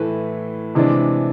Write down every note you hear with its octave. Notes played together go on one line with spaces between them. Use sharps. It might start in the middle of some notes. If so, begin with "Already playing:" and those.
Already playing: A2 E3 A3 E4 B4
C3 E3 G#3 D4